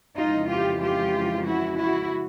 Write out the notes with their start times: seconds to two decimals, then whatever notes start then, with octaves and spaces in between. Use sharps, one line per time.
0.17 F2 C#3 E3 G#3 D#4 F4
0.49 F4 G4
0.82 F4 G4
1.47 E4 F#4
1.78 E4 F#4